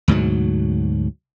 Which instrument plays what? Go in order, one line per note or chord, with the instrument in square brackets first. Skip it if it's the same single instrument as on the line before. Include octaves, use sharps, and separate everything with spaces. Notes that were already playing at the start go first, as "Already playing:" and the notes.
[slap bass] D2 G#2 B2 F#3